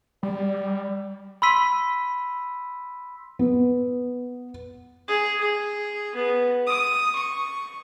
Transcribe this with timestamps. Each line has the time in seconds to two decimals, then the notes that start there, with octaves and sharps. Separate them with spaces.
0.23 G3 D5
1.42 B5 C6 E6 B6 D#7
3.39 B3
5.08 G#4
5.41 G#4
6.15 B3
6.67 D#6
7.15 C#6